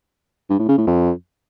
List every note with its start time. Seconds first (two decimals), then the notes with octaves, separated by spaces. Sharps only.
0.50 G2
0.59 A2
0.68 C#3
0.78 A2
0.87 F2